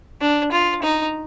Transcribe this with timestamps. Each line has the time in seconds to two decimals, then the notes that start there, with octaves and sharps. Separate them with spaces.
0.21 D4
0.52 F4
0.82 D#4